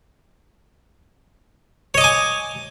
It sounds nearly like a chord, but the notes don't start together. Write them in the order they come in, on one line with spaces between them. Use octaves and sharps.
C#5 D#5 D6 G#5